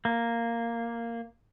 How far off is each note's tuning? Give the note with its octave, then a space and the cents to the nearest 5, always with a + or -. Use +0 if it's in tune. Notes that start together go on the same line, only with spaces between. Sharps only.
A#3 -5